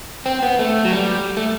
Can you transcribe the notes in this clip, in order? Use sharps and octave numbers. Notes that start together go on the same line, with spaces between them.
C4
B3
A3
F#3
G3
A3